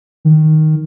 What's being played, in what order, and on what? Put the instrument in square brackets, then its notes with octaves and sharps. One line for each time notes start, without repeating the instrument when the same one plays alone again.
[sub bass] D#3